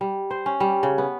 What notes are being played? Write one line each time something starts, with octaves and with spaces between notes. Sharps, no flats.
G3
C5
C#4
G3
C#3
B3